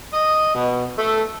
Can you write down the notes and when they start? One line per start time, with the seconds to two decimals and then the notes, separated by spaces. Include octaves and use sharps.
0.13 D#5
0.55 B2
0.97 A3